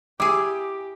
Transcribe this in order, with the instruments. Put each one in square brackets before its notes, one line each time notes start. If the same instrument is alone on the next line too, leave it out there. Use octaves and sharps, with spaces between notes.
[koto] E4 G#4 [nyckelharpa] G4 [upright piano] D6